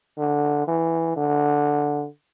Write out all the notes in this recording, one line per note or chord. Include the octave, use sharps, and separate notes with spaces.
D3
E3
D3